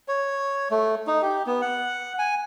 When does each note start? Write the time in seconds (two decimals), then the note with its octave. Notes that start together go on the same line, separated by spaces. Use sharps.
0.08 C#5
0.71 A3
1.07 D#4
1.22 G4
1.47 B3
1.61 F#5
2.19 G#5